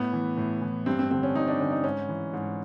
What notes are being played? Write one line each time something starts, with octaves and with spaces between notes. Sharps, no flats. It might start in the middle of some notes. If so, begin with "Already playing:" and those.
Already playing: A2 B3
E3
A2
E3
G2 C4
C4
D3 C4
C#4
G2 D#4
D4
D3 C#4
D#4
G#2 C#4
E3
G#2